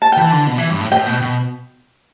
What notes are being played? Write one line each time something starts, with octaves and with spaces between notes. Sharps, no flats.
A5
G5
E3 A5
D3
B2
E3
G2
A2
A2 G5
B2
B2